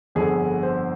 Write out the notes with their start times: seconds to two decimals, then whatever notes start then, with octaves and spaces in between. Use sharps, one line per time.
0.15 G1 F2 D3 G#4
0.63 C5